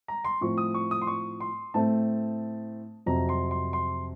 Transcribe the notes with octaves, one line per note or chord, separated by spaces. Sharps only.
A#5
C6
A2 F3 C4 C#6
D#6
C#6
D#6
C6
C#6
C6
A2 A3 C4 A5
F2 C3 F#3 C4 A#5
C6
C6
C6